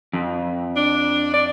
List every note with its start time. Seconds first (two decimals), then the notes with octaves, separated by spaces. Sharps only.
0.13 F2
0.76 D4
1.34 D5